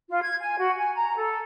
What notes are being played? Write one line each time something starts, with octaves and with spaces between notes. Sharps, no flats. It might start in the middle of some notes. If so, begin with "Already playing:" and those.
F4
G#6
G#5
F#4
G#5
A#5
A4